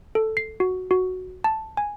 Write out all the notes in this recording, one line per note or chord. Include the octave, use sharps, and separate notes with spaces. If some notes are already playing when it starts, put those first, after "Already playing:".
A4
C7
F#4
F#4
A5
G#5